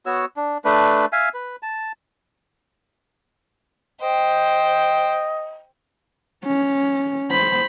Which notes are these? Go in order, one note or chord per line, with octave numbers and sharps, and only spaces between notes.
B3 F#4 C#5 E6
D4
A3 D4 B4
E5 F5 G#5
B4
A5
C5 D#5 G5
C#4
C5 B5